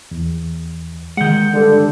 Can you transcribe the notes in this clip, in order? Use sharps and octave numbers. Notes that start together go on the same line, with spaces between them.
E2
D#3 G#3 F#5 G6
G2 D3